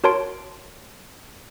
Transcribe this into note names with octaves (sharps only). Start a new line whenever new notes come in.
F#4 A#4 C#5 A5 C6 D7